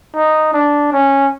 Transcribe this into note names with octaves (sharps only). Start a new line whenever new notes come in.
D#4
D4
C#4